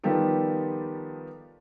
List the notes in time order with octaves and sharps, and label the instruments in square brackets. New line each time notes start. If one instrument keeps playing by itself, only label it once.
[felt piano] D#3 F3 G3 B3 G4 A4